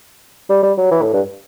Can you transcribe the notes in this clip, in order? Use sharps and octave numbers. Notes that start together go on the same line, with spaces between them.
G3
G3
F#3
E3
A2
G2